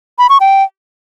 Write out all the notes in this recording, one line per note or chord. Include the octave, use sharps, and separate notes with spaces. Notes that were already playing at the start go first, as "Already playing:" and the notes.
B5
C#6
G5